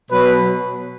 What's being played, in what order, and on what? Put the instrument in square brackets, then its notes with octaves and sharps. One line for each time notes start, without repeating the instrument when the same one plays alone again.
[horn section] B2 F#3 B4